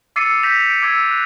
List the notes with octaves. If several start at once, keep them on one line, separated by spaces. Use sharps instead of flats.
D6 E6 A6 C7 C#7 D#7
D6 G6 A#6 B6 E7 F7
G6 D7
D6 E6 G#6 C#7
F#6